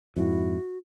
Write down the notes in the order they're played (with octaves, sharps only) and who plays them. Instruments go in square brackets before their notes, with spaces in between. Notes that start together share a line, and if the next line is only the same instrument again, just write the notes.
[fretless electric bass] F2 G#2 [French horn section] E4 [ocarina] F#4